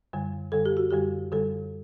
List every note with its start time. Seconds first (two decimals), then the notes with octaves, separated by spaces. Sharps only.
0.13 F#2 D3 G3
0.52 F#2 D3 G3 A4
0.66 G4
0.77 F#4
0.90 F#2 D3 G3 G4
1.32 F#2 D3 G3 A4